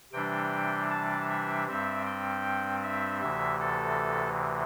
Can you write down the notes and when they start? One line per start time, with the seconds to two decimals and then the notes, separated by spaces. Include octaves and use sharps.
0.12 C3 E3 G3 D4 G5
0.90 A5
1.29 E5
1.67 G2 G3 C4 E5
2.06 G5
2.83 E5
3.21 D2 C3 E3 E5
3.60 A4